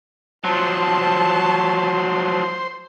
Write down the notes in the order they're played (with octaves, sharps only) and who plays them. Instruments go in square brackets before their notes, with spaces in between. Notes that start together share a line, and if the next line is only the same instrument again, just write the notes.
[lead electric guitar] F3 F#3 [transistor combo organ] C5 [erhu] A5